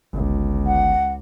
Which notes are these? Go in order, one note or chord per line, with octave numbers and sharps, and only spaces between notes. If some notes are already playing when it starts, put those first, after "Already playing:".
G1 C#2
F#5